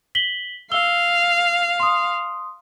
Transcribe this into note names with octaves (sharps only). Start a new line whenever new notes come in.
B6 F#7 G7
F5 E6 G7
C6 D#6